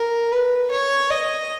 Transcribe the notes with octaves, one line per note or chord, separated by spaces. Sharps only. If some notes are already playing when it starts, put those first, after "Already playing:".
Already playing: A#4
B4
C#5
D#5